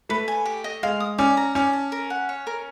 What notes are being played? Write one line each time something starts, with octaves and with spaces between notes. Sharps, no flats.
A3 B4
G#5
G4
D#5
G#3 F5
D#6
C#4 D5
A#5
C#4 D5
A5
A#4
F#5
C#5
A#4